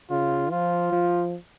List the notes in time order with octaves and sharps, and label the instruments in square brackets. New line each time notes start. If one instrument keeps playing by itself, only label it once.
[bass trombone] C#3 [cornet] F4
[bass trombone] F3 [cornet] F4
[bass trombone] F3